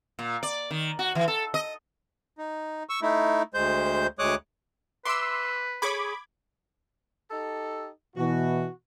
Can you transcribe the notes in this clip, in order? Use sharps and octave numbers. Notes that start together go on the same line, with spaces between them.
A#2
D5
D#3
F#4
E3
A4
D#5
D#4
C#6 E6
A3 D#4 E4
D2 G#3 C5 G6
D2 G#3 C#5 D6 D#6 F#6
B4 E5 C6 D6 E6
G#4 C#5 B5 D6 D#6 G#6
D#4 G4 A4
B2 E3 F#4